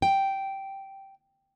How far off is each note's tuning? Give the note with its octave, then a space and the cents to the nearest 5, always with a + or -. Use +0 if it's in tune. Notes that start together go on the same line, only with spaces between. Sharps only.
G5 -10